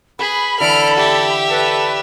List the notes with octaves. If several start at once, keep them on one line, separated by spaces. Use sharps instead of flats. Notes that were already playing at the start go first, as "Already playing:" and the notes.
G#4 B4 B5
D3 E3 A4 F6 D7
G4 E5
A4 B4